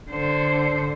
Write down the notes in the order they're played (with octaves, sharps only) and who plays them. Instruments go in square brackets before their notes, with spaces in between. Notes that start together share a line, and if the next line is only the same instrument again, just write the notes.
[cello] D3 C5